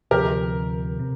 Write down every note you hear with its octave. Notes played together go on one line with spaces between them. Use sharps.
D2 C3 F3 G4 A#4
C3